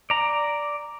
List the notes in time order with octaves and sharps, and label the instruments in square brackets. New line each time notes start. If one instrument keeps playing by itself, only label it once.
[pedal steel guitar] D5 A#5